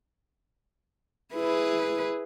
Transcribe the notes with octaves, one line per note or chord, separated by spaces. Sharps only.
E4 G#4 B4